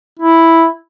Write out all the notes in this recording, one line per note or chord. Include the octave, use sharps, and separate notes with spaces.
E4